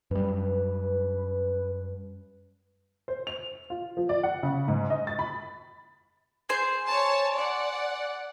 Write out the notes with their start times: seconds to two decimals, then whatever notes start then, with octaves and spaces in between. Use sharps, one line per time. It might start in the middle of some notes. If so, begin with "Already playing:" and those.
0.11 F#2 G3 B4
3.08 C5
3.27 F7
3.70 F4
3.97 F3
4.09 D5
4.23 F#5
4.43 C#3
4.68 G#2
4.90 D#5
5.07 A6
5.19 B5
6.49 G#4 C5 C6
6.87 C#5 A5
7.34 D5 F#5